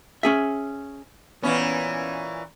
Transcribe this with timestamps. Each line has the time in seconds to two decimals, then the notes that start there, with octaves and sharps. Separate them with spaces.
0.23 C#4 G#4 E5
1.43 A#2 E3 B3 C#4